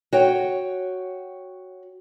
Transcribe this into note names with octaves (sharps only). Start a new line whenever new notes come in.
F#4 C#5 G5